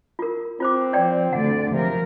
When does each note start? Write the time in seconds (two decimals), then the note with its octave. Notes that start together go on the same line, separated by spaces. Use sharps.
0.19 F4 A#4
0.60 C4 F4 C5 D6
0.93 F3 C#5 D5 G5
1.33 D2 D3 D5 F#5
1.72 C3 F3 F#3 A#4